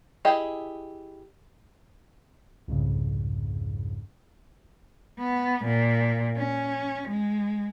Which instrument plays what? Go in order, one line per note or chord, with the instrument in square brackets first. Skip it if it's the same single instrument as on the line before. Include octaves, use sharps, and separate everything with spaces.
[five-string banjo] E4 G4 G#4 D#5
[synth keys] C2 F2 G#2 C#3
[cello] B3
A#2
C#4
G#3